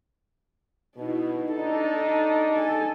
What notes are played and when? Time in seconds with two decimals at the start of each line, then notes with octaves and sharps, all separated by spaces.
0.97 B2 D#4 E4
1.52 D4 D#4 A4
2.53 A4 G#5